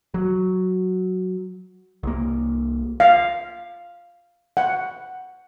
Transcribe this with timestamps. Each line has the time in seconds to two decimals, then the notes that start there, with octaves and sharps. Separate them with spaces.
0.14 F#3
2.03 C2 A#3
3.00 F5
4.57 F#5